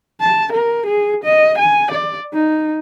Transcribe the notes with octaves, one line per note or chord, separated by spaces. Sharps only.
A5
A#4
G#4
D#5
G#5
D5
D#4